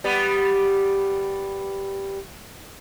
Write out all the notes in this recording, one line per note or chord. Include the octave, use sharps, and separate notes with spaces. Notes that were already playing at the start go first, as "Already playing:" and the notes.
G3 B3